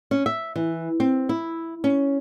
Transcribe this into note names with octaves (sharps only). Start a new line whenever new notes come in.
C#4
E5
E3
C4
E4
C#4